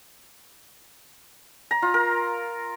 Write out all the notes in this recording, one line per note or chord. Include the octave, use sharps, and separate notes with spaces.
A#5
F4
A#4